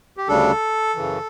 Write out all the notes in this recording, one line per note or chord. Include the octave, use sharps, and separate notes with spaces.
G4
D2 C#3 G3 D4 A4
F#2 C#3 E3